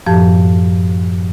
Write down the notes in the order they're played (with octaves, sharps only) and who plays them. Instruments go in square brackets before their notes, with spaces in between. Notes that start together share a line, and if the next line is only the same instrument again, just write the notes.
[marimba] F#2 A2 F3 G4 A5